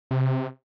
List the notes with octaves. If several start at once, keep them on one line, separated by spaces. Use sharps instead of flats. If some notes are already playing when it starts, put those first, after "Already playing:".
C3